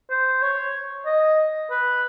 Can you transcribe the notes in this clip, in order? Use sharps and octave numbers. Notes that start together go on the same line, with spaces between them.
C5
C#5
D#5
B4